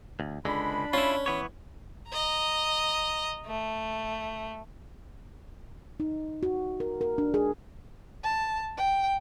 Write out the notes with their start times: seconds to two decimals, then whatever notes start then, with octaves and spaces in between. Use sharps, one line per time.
0.20 D2
0.45 C#2 D3 G#3 D4 B5
0.93 C#4 E4 F4
1.26 E3 B3 C#5
2.09 D#5 A#5
3.46 A3
6.00 D#4
6.43 F#4
6.80 A#4
7.01 A#4
7.18 D4
7.34 G#4
8.23 A5
8.77 G5